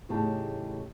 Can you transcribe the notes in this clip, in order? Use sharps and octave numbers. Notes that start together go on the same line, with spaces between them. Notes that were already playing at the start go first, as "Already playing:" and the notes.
E2 A2 C#3 D#4 G4 A5